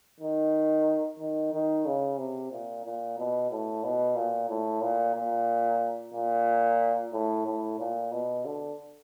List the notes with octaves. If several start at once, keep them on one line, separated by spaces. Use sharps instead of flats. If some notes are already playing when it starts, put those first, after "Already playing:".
D#3
D#3
D#3
C#3
C3
A#2
A#2
B2
A2
B2
A#2
A2
A#2
A#2
A#2
A2
A2
A#2
B2
D3